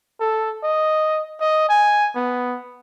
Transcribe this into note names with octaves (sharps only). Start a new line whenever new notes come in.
A4
D#5
D#5
G#5
B3